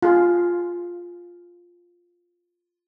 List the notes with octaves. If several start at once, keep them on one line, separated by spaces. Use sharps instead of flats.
F4 G#4